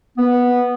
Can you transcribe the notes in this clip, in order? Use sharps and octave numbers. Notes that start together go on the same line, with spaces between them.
B3